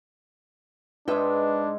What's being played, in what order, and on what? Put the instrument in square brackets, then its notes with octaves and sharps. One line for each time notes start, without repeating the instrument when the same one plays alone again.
[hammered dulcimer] G#2 G#3 [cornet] D4 [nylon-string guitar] B4 E5 G5